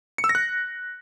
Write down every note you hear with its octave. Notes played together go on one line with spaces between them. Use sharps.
C#7
E6
A#6
F#6